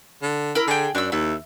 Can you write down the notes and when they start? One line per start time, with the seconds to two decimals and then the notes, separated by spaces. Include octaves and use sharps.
0.23 D3
0.55 E4 A#4 B5
0.68 D3 G#4 G5
0.95 F#2 D4 E6
1.12 D#2 E4